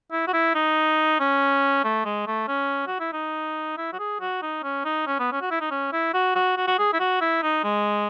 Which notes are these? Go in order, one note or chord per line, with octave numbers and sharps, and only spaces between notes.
E4
F#4
E4
D#4
C#4
A3
G#3
A3
C#4
F#4
E4
D#4
E4
F#4
G#4
F#4
D#4
C#4
D#4
C#4
B3
C#4
F#4
E4
D#4
C#4
E4
F#4
F#4
F#4
F#4
G#4
E4
F#4
E4
D#4
G#3